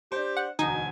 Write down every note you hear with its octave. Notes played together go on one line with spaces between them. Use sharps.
D4 G4 C5
F#5
E1 D2 D#4 G#5